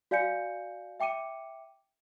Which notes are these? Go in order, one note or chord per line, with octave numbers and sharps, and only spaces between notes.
F#4 D5 F5 G#5 G6 C#7
E5 G5 D6 C#7 D#7